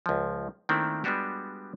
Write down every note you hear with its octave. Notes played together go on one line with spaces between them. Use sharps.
C#2 F3
D#3 A3 A#3 C4 D4 E4
G3 G#3 B3 D4 F#4 G4